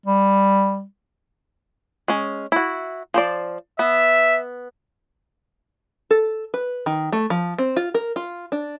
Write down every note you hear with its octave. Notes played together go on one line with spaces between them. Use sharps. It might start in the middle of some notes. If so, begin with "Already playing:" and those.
G3
G#3 C#4
E4 F#4
F3 C5 D5
B3 E5
A4
B4
D#3
A3
F3
C4
F4
A#4
F4
D4